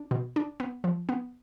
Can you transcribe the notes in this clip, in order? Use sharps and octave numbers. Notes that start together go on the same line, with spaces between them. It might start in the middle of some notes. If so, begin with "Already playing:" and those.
Already playing: D4
B2
D4
B3
F3
B3